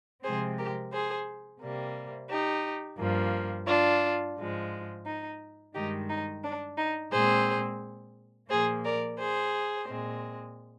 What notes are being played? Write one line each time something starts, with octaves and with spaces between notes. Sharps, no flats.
C3 F3 G#3 C4 G#4 C5
G4 A#4
G#4 C5
C3 G3 A#3
D#4 G4
G2 F3 A#3
D4 F4
G#2 F3 G#3
D#4
G2 D#3 G#3 D#4 G4
D#4
D4
D#4
A#2 G#3 C4 G#4 C5
A#2 F3 A#3 G#4 C5
A#4 D5
G#4 C5
A#2 G#3 C4